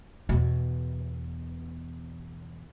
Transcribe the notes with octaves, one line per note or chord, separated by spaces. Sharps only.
E2 B2